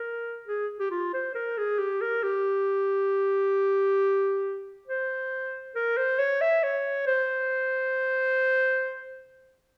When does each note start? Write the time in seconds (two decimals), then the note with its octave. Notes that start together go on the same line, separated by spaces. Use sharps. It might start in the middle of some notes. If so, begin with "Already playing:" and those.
Already playing: A#4
0.47 G#4
0.80 G4
0.91 F4
1.14 C5
1.35 A#4
1.58 G#4
1.78 G4
2.01 A#4
2.23 G4
4.87 C5
5.75 A#4
5.97 C5
6.19 C#5
6.41 E5
6.63 C#5
7.07 C5